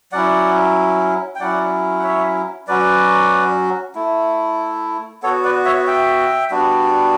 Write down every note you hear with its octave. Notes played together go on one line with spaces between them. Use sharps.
F#3 C#4 E4 D5 F#5
G5
F#3 C#4 E4 D5 F#5
F#5
C#5 E5
F#3 C#4 F#4 B4 D5
A3 E4
B3 F#4 A4 C#5
B4 D5
C#5 E5
E5 G5
G3 B3 D4 F#4